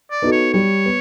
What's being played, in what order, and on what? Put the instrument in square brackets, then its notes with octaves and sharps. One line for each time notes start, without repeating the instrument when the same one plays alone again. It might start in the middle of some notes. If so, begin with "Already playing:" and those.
[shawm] D5
[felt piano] B3 D#4 F#4 A4
[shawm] C#5
[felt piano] G3 [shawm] C#5
[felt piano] B3